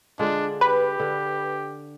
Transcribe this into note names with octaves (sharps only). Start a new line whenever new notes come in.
D3 G#3 D4 F4
G4 B4
D3